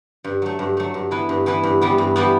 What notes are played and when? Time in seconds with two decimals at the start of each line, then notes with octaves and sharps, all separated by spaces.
0.24 G2
0.42 F#3 A3
0.59 G2
0.77 F#3 A3
0.94 G2
1.11 E3 B3 E4 B4
1.29 G2
1.46 E3 B3 E4 B4
1.63 G2
1.81 E3 G3 B3
1.98 G2
2.16 E3 G3 B3